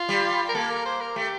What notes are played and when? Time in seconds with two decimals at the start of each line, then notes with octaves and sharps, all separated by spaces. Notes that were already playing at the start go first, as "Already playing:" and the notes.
Already playing: F4
0.09 G3
0.49 A#4
0.55 A#3 A4
0.70 A#4
0.86 C5
1.01 A#4
1.16 A3 G4